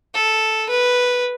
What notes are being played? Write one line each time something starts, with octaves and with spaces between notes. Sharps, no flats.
A4
B4